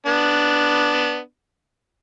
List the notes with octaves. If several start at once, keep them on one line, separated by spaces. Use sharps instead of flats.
B3 D4